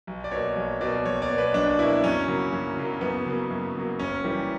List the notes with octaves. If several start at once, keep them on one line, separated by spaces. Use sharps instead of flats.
B1
D5
B2 A#3 C#5
B1
B2 A#3 D5
B1 C#5
D5
B2 A#3
B4
B1 D4
B2 A#3 E4
F#2 C#4
C#3 F#3 A#3
F#2
C#3 F#3 A#3
F#2 B3
C#3 F#3 A#3
F#2
C#3 F#3 A#3
F#1 C#4
F#2 E3 G3 A#3